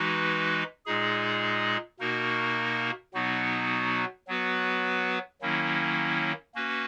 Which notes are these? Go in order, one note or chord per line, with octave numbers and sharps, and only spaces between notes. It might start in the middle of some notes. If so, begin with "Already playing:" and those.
Already playing: E3 G#3 D#4 F#4 B4
A#2 G#3 D#4 G#4
B2 A#3 D#4 F#4 A#4
B2 F#3 B3 D#4 F#4
F#3 B3 F#4 B4
D#3 F#3 A#3 C#4 E4
A#3 C#4 F#4 B4